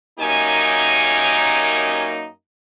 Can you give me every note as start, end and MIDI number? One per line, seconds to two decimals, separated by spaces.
0.19 2.27 42
0.19 2.27 58
0.19 2.09 61
0.19 2.27 63
0.19 2.09 67
0.19 2.09 80